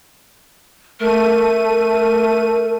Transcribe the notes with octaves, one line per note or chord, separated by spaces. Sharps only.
A3 A#4 D#7